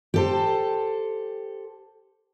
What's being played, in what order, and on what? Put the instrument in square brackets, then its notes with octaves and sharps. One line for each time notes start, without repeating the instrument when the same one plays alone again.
[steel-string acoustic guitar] G4 A4 C5